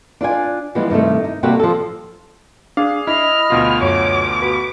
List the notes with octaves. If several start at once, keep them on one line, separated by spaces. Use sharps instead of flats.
D4 F4 D5 G#5
E3 F3 G3 G#3 B3
G2 C3 D#3 A3
D#4
C3 G3 A#3 F#4 G4 A4
F3 A4
D4 G#4 F5
E4 D#5 B5 F6
D2 B2 F4 B5
F#2 C#5 D6
F#4 B4